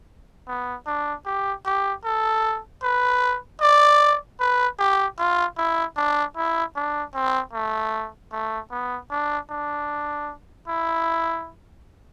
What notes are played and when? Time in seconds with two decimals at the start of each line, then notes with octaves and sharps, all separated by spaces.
0.48 B3
0.86 D4
1.26 G4
1.65 G4
2.05 A4
2.83 B4
3.61 D5
4.40 B4
4.79 G4
5.19 F4
5.57 E4
5.97 D4
6.37 E4
6.76 D4
7.14 C4
7.53 A3
8.32 A3
8.71 B3
9.11 D4
9.50 D4
10.68 E4